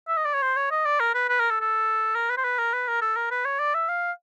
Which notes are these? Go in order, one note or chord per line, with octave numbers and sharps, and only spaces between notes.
E5
D#5
D5
C#5
C5
C#5
D#5
D5
A#4
B4
B4
A#4
A4
A4
A#4
B4
C5
B4
A#4
B4
A#4
A4
A#4
B4
C#5
D5
E5
F5